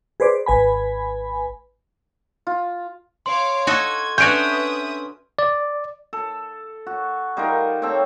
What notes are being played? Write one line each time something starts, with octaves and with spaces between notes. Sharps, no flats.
G#4 B4 C5 D5
G#1 B4 G#5 B5
F4
C#5 F5 C6 D6
F#4 A4 D#5 G#6
C#4 D4 F#4 B4 E5 D#6 G6 D7
D5
A4
F#4
G3 D#4 F4 A#4
C4 A4 C#5 G5